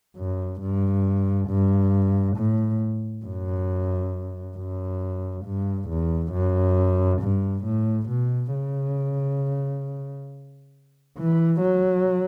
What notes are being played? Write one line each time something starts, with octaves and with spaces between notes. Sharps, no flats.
F#2
G2
G2
A2
F#2
F#2
G2
E2
F#2
G2
A2
B2
C#3
E3
F#3